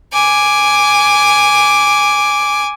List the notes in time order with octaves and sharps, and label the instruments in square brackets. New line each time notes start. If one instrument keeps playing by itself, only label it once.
[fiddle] G#5 D6